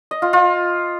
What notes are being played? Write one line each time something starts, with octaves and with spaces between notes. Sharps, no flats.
D#5
F4
F4